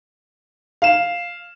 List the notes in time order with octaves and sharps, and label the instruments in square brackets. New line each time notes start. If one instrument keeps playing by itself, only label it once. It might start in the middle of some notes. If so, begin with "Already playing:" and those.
[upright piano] F5 E7